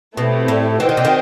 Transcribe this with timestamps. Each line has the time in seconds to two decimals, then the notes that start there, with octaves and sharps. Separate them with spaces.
0.17 B2 A3 C4 E4 G4
0.48 A2
0.79 E3 F#4 C5 D#5 G5
0.89 D#3
0.97 C3
1.05 D#3